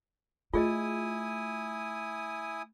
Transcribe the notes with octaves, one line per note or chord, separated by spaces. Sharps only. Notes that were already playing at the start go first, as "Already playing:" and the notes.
A3 E4 F4 G#4 D#5 G#5 D#6